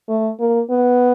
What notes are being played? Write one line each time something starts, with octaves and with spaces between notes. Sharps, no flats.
A3
A#3
B3